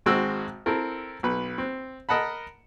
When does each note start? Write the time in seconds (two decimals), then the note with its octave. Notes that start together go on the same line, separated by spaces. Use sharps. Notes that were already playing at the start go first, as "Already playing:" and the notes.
0.06 G#1 G#3 C4 F#4 E6
0.66 C4 E4 A4 A#4
1.23 B1 B4
1.58 C4
2.09 A#4 D#5 F#5 A5 B5